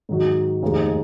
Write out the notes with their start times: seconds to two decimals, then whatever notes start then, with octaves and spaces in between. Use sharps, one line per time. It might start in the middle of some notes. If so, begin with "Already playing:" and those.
0.09 G#2 D#3 F#3
0.63 F1 D#2 D#3 G#3